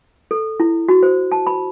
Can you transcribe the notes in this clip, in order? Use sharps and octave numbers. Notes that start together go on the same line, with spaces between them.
A4
E4
F#4
C5
A5
B5